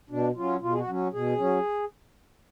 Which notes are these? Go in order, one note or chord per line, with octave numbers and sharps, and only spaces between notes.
B2 D4
F#3 C#4 F4
B2 F4
G#4
F#4
F#3 C#4
B2 G#4
F#3 C#4